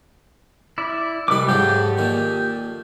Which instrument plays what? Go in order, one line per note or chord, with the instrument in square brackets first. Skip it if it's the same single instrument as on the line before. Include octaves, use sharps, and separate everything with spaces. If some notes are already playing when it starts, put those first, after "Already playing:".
[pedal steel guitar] E4 D5
[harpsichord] C2 D#4 [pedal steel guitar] G3 B4 D6
[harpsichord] G#2 C#3 F#3 [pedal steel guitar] G4 A4
[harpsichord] A#2 D#3